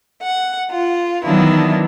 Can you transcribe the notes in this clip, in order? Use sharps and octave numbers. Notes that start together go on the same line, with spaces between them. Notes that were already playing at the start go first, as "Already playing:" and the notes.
F#5
F4
D#3 E3 F#3 B3 D4 E4